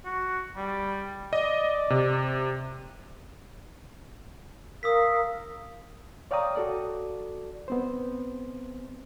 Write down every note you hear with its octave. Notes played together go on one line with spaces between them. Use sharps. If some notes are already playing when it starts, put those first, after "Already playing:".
F#4
G3
D5 D#5
C3
A#4 F5 D#6 E6 B6
C#5 D5 F5 G5 A#5 D#6
F#4 A4 D5
B3 C4 C5